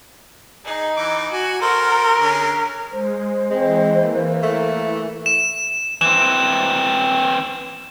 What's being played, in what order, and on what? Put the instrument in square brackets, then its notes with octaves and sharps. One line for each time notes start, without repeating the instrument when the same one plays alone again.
[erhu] D#4 [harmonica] G#4
[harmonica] E3 D6
[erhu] F#4 [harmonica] G#5
[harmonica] F#4 A4 C5 [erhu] A#4
[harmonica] D3 C#4 G#4
[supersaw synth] G#3 [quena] C5
[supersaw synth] E3 [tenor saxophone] G#3 [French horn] C4
[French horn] A#3
[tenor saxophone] A3
[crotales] E7
[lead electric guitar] E3 C4 [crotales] E7